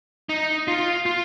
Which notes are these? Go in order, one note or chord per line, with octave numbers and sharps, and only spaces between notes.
D#4
F4
F4